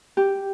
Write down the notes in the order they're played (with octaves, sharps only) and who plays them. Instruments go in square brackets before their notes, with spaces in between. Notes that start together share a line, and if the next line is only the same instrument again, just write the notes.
[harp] G4